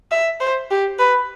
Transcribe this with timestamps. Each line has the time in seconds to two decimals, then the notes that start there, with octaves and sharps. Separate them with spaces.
0.11 E5
0.40 C5
0.71 G4
0.99 B4